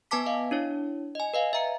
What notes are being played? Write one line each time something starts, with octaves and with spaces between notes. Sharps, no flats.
B3 B4 G#5 A5 D6 B6
D#5 F5
D4 E4 C#5
D#5 G#5
B4 D#5 F5
E5 A#5 C#7